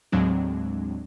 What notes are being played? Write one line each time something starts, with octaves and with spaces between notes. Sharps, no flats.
D#2 A2 F#3 G#3 C4 D4